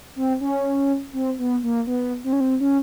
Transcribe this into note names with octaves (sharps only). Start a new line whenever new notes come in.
C4
C#4
C4
B3
A#3
B3
C4
C#4
C4
C#4